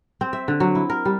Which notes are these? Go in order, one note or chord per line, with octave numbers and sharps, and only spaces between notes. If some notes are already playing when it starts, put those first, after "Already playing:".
C4
E5
D3
F#3
E4
A#4
G3